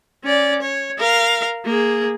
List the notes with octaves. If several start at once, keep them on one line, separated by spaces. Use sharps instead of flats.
C#4 D5
C#5
A#4 F5
A#3 G#4